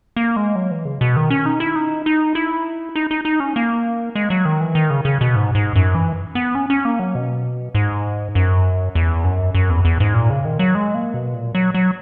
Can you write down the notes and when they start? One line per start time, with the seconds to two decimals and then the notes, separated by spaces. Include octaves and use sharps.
0.16 A#3
0.36 G#3
0.55 F#3
0.71 E3
0.85 C#3
1.01 B2
1.16 D#3
1.30 C#4
1.46 D#4
1.60 E4
1.76 D#4
2.06 D#4
2.35 E4
2.95 D#4
3.11 D#4
3.25 D#4
3.40 C#4
3.56 A#3
4.15 G#3
4.30 F#3
4.45 D#3
4.61 E3
4.75 D#3
4.90 C#3
5.05 C#3
5.21 B2
5.36 G#2
5.55 G#2
5.75 F#2
5.95 E3
6.35 B3
6.55 C#4
6.70 C#4
6.85 A#3
6.99 F#3
7.15 B2
7.75 G#2
8.35 F#2
8.95 E2
9.24 F#2
9.54 F#2
9.70 E2
9.85 E2
10.00 G#2
10.14 A#2
10.30 C#3
10.45 D#3
10.59 F#3
10.75 G#3
10.94 A#3
11.14 B2
11.34 A#2
11.55 F#3
11.74 F#3